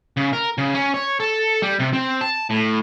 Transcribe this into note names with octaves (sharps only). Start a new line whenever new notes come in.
C#3
A#4
C#3
C#4
C#5
A4
G3
C3
C4
A5
A2